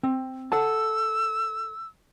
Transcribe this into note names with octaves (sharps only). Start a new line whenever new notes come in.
C4
A4 F#5 A5 E6